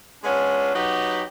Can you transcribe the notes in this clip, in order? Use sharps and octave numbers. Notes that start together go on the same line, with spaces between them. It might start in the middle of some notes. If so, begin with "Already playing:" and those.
G#3 B3 C#4 D4 F4
F#3 B3 D#4 G4